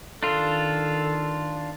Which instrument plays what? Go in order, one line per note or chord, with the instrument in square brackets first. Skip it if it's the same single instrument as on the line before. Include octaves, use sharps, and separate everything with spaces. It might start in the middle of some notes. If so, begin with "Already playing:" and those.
[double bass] D#3 [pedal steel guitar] D4 F4 [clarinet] A4